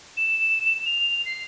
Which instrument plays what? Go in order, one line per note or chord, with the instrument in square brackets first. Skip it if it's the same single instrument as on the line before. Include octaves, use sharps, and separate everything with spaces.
[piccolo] E7
F7
C7